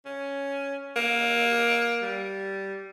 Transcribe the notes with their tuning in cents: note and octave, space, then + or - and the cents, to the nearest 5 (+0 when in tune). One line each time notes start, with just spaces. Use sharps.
C#4 +5
A#3 +15
G3 -10